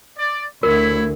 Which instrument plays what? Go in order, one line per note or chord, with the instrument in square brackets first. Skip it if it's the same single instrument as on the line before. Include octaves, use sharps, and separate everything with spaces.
[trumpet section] D5
[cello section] D2 [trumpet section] E4 C#5 B5 [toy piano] A#4